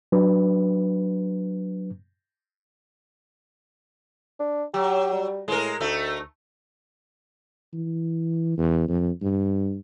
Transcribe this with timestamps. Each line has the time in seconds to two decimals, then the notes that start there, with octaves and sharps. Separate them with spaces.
0.12 F#3 D4 B4
4.40 D4
4.74 F#3 G4
5.13 G3
5.48 A2 G#3 A#4
5.80 D2 A3 D#4
7.73 E3
8.57 E2
8.88 F2
9.22 G2